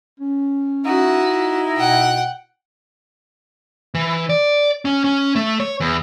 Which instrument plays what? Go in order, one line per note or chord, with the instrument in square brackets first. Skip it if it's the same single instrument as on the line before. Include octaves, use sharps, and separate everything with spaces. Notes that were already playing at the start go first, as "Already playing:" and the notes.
[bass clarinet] C#4
[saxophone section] D#4 E4 [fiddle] F#4
[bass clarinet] B2 [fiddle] F#5 G5
[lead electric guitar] E3
D5
C#4
C#4
A3
C#5
E2